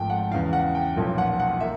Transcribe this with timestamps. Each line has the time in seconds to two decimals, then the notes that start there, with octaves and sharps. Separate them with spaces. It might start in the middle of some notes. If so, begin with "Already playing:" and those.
Already playing: G#1 G#2 F3 A3 G5
0.10 F#5
0.31 E2 C#3 E3 F5
0.53 F#5
0.75 G5
0.96 B1 A#2 F3
1.18 F#5
1.40 F#5
1.60 A#3 E5